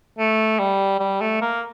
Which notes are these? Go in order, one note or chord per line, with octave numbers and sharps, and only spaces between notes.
A3
G3
G3
A3
A#3